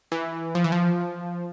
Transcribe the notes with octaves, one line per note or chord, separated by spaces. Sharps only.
E3
F3
E3
F3